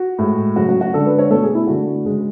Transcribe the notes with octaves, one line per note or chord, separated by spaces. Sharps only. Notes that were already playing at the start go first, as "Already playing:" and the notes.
Already playing: F#4
A2 G#3
C#3 F#3 A3 F#4
F#4
F#4
D3 G#3 A4
B4
C#5
B2 A3 A4
G#4
E4
D3 A3 F#4
C#3 G#3